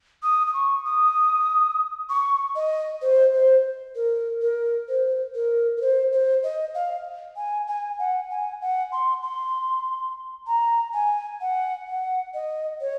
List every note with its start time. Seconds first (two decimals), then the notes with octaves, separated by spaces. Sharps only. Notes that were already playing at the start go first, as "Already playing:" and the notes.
0.23 D#6
0.47 D#6
0.54 C#6
0.85 D#6
2.10 C#6
2.56 D#5
3.02 C5
3.34 C5
3.96 A#4
4.41 A#4
4.88 C5
5.35 A#4
5.77 A#4
5.81 C5
6.12 C5
6.43 D#5
6.75 F5
7.37 G#5
7.68 G#5
7.99 F#5
8.30 G#5
8.62 F#5
8.92 C6
9.23 C6
10.47 A#5
10.94 G#5
11.41 F#5
11.87 F#5
12.34 D#5
12.81 C#5